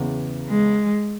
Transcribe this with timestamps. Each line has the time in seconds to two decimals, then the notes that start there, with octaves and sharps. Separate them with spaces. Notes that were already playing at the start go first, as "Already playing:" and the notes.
Already playing: E2 C#3 E3
0.48 G#3